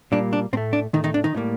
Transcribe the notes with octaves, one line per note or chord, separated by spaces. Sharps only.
A#2 G3 A#3 D4
D4
A2 A3 C4
D4
A2 D#3 A3 D#4
D#3 D#4
D4
D#3 D#4
A2 G3 A#3